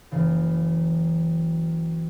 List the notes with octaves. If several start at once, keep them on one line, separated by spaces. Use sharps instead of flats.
F#1 E3 F5